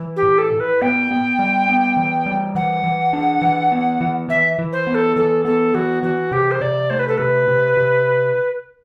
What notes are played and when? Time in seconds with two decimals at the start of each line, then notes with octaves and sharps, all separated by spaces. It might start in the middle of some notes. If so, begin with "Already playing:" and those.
Already playing: E3
0.16 G4
0.23 A2
0.38 A4
0.53 A2
0.60 B4
0.81 B3 G5
1.11 B3
1.39 G3
1.69 B3
1.97 E3
2.26 G3
2.55 E3 F#5
2.84 E3
3.13 D4
3.42 E3
3.72 B3
4.01 E3
4.28 E3 E5
4.59 E3
4.72 C5
4.87 B3
4.94 A4
5.16 E3 A4
5.45 B3 A4
5.74 E3 F#4
6.03 E3 F#4
6.31 C3 G4
6.51 C5
6.61 C3 D5
6.90 A3 C5
6.99 B4
7.08 A4
7.17 C3 B4
7.48 C3
7.77 C3